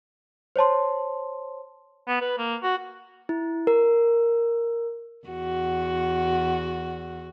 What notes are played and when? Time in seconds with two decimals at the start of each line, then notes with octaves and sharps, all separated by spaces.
0.56 C5 C#5 A5 C6
2.07 B3
2.21 B4
2.38 A#3
2.63 F#4
3.29 E4
3.67 A#4
5.27 E2 F#4